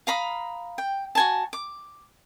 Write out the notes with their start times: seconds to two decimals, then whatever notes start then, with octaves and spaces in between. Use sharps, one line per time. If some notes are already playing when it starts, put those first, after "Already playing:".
0.07 F5 A#5 B5 D#6
0.78 G5
1.15 F#4 G#5 A5
1.53 D6